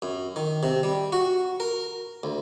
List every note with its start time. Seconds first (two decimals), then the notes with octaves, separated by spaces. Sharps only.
0.02 F#2
0.36 D#3
0.63 C3
0.83 G3
1.12 F#4
1.60 A#4
2.23 D2